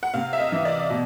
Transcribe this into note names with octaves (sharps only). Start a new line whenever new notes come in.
F#5
C3 F5
E5
D#5
E3
D5
B2